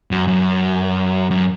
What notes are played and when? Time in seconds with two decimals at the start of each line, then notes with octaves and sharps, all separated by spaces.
0.11 F#2
0.28 F#2
1.31 F#2